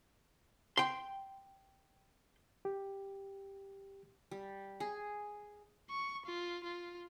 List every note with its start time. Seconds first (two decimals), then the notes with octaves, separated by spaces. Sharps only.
0.77 G5 C6
2.65 G4
4.31 G3
4.80 G#4
5.90 C#6
6.26 F4
6.64 F4